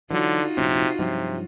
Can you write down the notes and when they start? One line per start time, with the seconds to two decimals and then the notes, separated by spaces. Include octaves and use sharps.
0.11 D3 E3 F#3 D#4 F4 F#4
0.57 F1 A#1 C3 C#4
0.99 G2 C3 F3 F#3